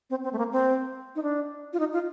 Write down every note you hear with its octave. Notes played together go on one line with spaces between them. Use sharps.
C4
C4
A3
A#3
C4
D#4
D4
F4
D#4
F4